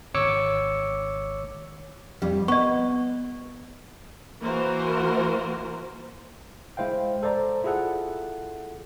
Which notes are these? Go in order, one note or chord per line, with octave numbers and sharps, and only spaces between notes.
G#1 C#5 D6 E6 C#7
F2 G3
B3 D#5 C#6
E3 A#3 F#4 A#4 C5
G#3 E4 C5 F5 G5
A4 C5 D5 A#5
E4 F4 G#4 A4 F#5